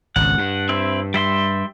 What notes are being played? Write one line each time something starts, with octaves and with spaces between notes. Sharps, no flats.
G#1 C#2 F#5
G2
C4 E4
G3 E5 C6